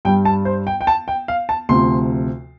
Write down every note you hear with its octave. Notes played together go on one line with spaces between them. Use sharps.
G2 G3 G5
A5
C5
G5
G5
A5
G5
F5
A5
D2 C3 F3 C6